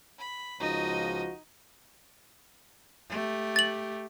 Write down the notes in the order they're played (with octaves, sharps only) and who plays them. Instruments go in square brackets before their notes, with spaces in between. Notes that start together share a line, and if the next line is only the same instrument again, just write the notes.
[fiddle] B5
[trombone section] C#2 F3 F#4 [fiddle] D#4 D#5
[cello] A3 G4
[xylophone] A6 F#7